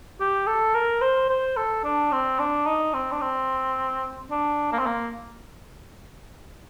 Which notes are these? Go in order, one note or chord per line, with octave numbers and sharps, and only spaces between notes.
G4
A4
A#4
C5
C5
A4
D4
C4
D4
D#4
C4
D4
C4
D4
A#3
C4
A#3